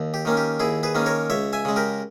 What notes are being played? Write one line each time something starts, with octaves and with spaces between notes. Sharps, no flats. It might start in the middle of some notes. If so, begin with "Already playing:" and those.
Already playing: D#2
G4
D#3 A#3 C#4
G4
D#2 E4 G#4
G#4 B4
D#3 A#3 C#4
A#4 C#5
C#2 C#5 E5
E5 G#5
C#3 G#3
G4 A#4